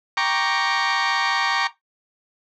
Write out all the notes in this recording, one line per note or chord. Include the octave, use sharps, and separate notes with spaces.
G5 A#5 C#6 D6